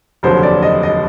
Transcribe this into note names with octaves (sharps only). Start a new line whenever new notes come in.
F1 D#2 D3 F#3 C5
D5
D#5
D#5